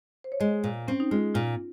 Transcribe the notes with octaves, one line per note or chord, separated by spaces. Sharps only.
C5
C#5
G#3 D#5
A#2
C4 C#4
D#4
G#3 F4
A#2 F4